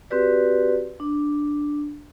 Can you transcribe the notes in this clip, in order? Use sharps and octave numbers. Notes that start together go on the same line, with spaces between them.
C4 F#4 G4 B4 D5
D4